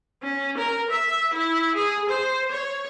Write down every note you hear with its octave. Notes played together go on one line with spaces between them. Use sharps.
C#4
A#4
E5
E4
G#4
C5
C#5